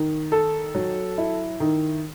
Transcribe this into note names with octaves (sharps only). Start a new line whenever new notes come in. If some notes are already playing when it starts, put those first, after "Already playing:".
Already playing: D#3
A4
F#3
E4
D#3